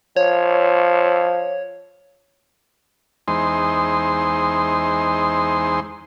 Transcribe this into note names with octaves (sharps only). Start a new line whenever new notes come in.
F3 C#5
E2 G#3 D#4 C5 C6